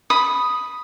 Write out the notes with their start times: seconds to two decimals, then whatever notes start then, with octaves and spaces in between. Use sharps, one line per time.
0.10 B5 D#6